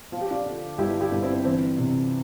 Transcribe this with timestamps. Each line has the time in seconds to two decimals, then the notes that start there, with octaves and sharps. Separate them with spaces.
0.12 F3 F4
0.21 G4
0.31 D4 F4
0.46 D3
0.78 G1 E4 G4
1.00 E4 G4
1.12 G2
1.23 C4 E4
1.45 E3 C4
1.78 C3